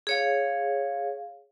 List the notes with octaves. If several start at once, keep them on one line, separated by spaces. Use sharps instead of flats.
G#4 C#5 F5